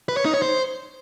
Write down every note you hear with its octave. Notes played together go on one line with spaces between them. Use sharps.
B4
C#5
D#4
C#5
C5